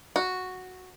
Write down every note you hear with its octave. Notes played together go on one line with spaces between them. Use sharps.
F#4